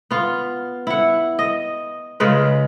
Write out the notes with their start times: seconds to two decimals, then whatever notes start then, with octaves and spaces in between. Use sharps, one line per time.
0.11 B3 F4
0.87 E4 F#5
1.39 D#5
2.20 C#3 G#3 F4 B4